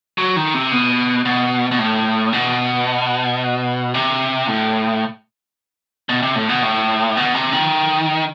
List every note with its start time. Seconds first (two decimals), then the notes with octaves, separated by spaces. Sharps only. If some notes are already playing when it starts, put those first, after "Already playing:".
0.18 F#3
0.36 D#3
0.54 C3
0.72 B2
1.25 B2
1.71 B2
1.79 A2
2.33 B2
3.94 C3
4.47 A2
6.09 B2
6.23 C3
6.36 A2
6.49 B2
6.63 A2
7.17 B2
7.34 C3
7.53 D#3